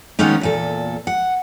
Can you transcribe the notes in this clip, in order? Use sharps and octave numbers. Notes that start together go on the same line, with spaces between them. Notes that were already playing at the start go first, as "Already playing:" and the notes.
D#3 G#3 A#3 B3 C#4 D#4
E2 A#2 A4
F#5